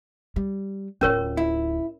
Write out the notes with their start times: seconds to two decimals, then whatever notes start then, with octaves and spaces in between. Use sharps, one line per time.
0.36 G3
1.01 D1 C#4 F4 A#4 C#5
1.37 E4